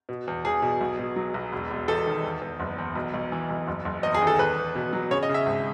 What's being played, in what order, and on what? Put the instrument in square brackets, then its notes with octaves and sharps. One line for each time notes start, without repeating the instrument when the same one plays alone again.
[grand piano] B2
E2
E2 G#4
B2
B1
B2
F#3
B1
E1
E1
E2 A4
D#3
E2
E2
F#1
E2
B1
B1
E3
B1
F#1
F#1
E2 D#5
G#4
D#3
A4
E2 B4
E2
B2
F#3
C#3 C#5
D#5
C#3
E5
G#1